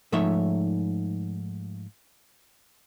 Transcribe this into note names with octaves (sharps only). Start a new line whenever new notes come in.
G#2 F3 A3 D#4 C#5 E5